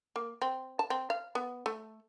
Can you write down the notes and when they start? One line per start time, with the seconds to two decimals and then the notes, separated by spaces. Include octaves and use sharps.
0.16 A#3
0.42 C4
0.79 A5
0.90 C4
1.10 F5
1.35 B3
1.66 A3